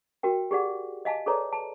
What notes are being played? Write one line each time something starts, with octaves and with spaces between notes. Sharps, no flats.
F#4 A#4 G5
G4 G#4 D5 F#5
D#5 F5 G#5 A5
G#4 A4 B4 C#5 D5 A#5
A5